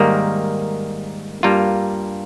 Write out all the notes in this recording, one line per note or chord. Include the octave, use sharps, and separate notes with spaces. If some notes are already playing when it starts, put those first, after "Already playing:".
Already playing: G#2 D#3 G3 A#3
G2 G3 A#3 F4 A#4